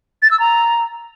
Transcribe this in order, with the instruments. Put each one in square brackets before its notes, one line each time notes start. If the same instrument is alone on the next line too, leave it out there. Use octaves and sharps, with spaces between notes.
[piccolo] A6
E6
A#5